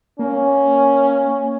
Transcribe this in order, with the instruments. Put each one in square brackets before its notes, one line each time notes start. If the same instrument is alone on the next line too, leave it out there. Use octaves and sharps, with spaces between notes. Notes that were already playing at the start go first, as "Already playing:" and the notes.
[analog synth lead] A#3 [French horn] C#4